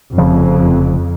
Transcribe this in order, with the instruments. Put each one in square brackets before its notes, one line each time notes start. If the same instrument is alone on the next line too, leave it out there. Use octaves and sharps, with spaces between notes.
[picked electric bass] F1 C#3 F3 [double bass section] F2